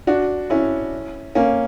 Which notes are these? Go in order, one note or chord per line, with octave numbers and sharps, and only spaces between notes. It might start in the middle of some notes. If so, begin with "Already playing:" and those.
D4 F#4
C#4 E4
A#3 C#4